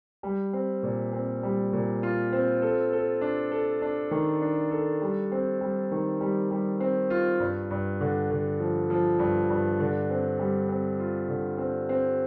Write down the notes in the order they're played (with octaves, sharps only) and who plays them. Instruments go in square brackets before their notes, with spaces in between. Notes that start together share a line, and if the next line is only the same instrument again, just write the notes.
[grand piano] G3
C4
A#2
C4
G3
A#2
F4
C4
A4
A4
D4
A4
D4
D#3
D4
A4
G3
C4
G3
D#3
G3
G3
C4
F4
G2
G2
D3
D3
F3
F3
G2
G2
D3
C4
G3
C4
F4
D3
C4
C4